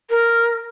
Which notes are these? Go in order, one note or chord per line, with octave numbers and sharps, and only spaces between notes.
A#4